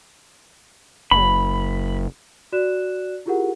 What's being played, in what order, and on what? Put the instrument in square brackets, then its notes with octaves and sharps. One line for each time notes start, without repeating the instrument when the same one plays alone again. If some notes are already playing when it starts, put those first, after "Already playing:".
[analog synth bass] F#1 [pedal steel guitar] B5
[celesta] F#4 D5 F#6 E7
E4 F4 G4 G#4 A#4 F#5